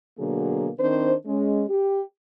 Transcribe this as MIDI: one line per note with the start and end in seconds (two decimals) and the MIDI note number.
0.18 0.68 47
0.18 0.68 50
0.18 0.68 54
0.18 0.68 58
0.18 0.68 68
0.78 1.13 51
0.78 1.13 60
0.78 1.13 62
0.78 1.13 72
1.26 1.63 56
1.26 1.63 61
1.69 2.01 67